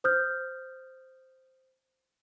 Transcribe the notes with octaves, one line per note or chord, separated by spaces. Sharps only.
C5 D#6 F6 G6